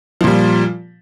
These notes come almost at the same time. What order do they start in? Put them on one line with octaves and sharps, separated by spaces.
F3 A#2 G3